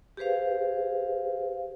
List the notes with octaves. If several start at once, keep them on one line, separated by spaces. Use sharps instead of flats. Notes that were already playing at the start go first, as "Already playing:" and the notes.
G4 G#4 B4 C5 F5